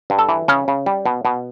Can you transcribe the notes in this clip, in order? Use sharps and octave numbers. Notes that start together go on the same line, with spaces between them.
G2
A4
E3
C#3 C#4
C#3
G3
B2
B2